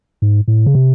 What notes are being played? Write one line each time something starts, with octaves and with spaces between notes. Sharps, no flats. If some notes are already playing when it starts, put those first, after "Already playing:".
G#2
A2
C#3
C3